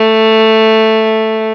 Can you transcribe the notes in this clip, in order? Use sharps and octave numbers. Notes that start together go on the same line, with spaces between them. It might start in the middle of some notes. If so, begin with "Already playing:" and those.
Already playing: A3